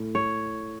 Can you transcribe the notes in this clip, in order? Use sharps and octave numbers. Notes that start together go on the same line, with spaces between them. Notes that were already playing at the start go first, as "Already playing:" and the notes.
Already playing: A2
C#5